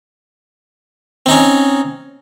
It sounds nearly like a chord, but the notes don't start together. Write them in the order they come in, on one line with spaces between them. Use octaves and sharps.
C4 D#4 C#4